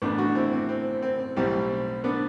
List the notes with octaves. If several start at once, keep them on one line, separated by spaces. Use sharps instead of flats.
A1 A2 E3 B3 D4
D4 F#4
C4 E4
C4
C4
C4
C4
B1 A2 G3 C4
B3 D4